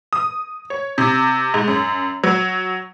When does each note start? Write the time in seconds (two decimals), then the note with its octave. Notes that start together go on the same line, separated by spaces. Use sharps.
0.13 D#6
0.70 C#5
0.98 C3
1.54 G#2
1.68 F#2
2.24 F#3